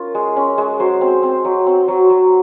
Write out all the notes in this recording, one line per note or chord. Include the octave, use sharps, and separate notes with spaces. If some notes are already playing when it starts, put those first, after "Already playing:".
Already playing: C#4 F4 A#4
G#3
C#4
G#3
F#3 C5
C4
C4
F#3
C4
F#3
F#3